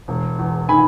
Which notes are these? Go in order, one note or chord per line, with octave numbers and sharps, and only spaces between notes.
E1
E2
D#3 G#5 B5